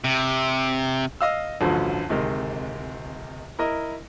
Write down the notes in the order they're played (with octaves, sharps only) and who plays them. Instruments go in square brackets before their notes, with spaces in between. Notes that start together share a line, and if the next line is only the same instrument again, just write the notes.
[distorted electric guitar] C3
[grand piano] D#5 F5 E6
A1 D2 G2 D3 F3 F#3
D1 C3 D#3 G#3
E4 A#4 D#5